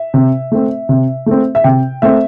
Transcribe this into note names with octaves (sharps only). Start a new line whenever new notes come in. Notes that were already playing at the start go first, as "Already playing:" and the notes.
Already playing: E5
C3
A3 C4
C3
A3 C4
E5
C3 G5
A3 C4 E5